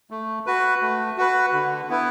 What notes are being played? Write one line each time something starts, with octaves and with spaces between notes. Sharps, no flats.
A3
F#4 B4
A3
F#4 B4
D3
B3 E4 B4